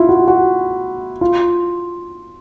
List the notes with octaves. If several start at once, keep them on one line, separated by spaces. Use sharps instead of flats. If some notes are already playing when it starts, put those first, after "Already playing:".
Already playing: E4 F4
F#4
F#4
F4